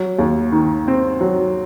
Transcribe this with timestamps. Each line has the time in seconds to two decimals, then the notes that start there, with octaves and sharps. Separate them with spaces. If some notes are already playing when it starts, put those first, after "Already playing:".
Already playing: F#3
0.18 D#2
0.52 D#3
0.88 C4
1.21 F#3